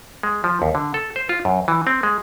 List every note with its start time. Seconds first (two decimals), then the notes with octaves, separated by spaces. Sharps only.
0.23 G#3
0.44 F3
0.62 D#2
0.75 D3
0.94 A4
1.16 C5
1.29 F4
1.45 F#2
1.68 E3
1.87 C4
2.03 G#3